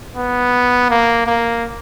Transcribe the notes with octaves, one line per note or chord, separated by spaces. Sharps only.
B3
A#3
A#3